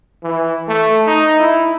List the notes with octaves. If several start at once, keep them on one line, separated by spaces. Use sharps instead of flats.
E3
A3
D#4
E4